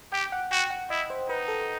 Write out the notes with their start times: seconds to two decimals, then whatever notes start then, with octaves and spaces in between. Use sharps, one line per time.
0.12 G4 G5
0.32 F#5
0.51 F#4 G5
0.70 F#5
0.90 E4 D#5
1.10 C5
1.28 D#4 B4
1.48 A4